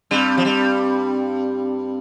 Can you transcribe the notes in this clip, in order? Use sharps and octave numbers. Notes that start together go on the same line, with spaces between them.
G2 G3 C4
F3
G2 G3